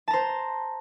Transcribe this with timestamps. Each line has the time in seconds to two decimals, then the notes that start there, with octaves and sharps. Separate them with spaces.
0.08 A5
0.11 A#5
0.13 C5